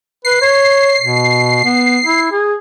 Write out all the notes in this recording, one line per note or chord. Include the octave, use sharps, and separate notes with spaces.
B4 C7
C#5
B2
B3
E4
G#4